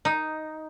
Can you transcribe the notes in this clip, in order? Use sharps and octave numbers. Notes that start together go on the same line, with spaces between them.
D#4